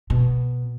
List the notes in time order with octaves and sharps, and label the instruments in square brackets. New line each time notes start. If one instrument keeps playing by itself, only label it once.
[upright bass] B2